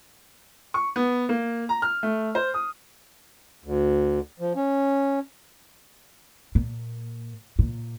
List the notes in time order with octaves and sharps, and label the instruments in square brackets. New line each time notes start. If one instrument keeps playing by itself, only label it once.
[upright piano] C#6
B3
A#3
A#5
F6
A3
C5
D#6
[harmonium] D2
F3
C#4
[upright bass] A#2
A#2